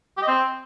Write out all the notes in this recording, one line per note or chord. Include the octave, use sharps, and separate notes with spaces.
G4
D#5
C4